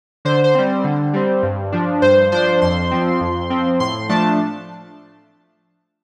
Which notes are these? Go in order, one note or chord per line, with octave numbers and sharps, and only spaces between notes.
D3 C5
C5
G3 C4
D3
G3 C4
G2
F3 D4
G2 C5
F3 D4 C5
F2 C6
F3 C4
F2
F3 C4
A2 C6
F3 A3 D4 A5